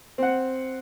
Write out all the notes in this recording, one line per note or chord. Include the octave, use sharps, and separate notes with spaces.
C4 F#5